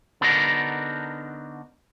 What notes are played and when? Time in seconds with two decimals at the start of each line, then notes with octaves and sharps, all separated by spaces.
0.21 D3 B3 D4 D#4 F#4 A#4